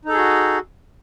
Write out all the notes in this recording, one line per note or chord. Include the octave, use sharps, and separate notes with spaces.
D#4 F#4 G#4 A4